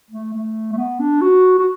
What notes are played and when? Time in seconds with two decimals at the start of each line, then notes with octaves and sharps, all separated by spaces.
0.11 A3
0.33 A3
0.72 A3
0.77 B3
1.00 D4
1.21 F#4
1.59 F#4